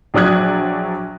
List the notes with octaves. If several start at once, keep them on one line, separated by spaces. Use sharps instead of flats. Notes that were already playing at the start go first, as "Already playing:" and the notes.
A#1 F#3 D5 D#6 F#6 G#6